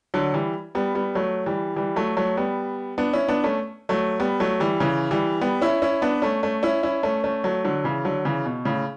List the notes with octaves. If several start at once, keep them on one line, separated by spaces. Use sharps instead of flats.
D3 F#3
E3 G3
G3 B3
G3 B3
F#3 A3
E3 G3
E3 G3
F#3 A3
F#3 A3
G3 B3
B3 D4
C#4 E4
B3 D4
A3 C#4
F#3 A3
G3 B3
F#3 A3
E3 G3
C#3 E3
E3 G3
G3 B3
C#4 E4
C#4 E4
B3 D4
A3 C#4
A3 C#4
C#4 E4
C#4 E4
A3 C#4
A3 C#4
F#3 A3
D3 F#3
C#3 E3
D3 F#3
C#3 E3
B2
A2 C#3